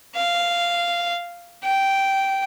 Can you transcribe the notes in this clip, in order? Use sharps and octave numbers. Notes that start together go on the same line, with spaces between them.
F5
G5